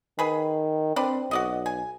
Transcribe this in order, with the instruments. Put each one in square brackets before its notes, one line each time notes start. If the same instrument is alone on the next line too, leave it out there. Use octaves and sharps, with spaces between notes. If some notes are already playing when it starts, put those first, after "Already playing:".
[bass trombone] D#3 [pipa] G#4 B4
[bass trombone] C4 [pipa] D4 B4 D5
[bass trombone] B1 [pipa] F#4 D5 D#5
[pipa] G#5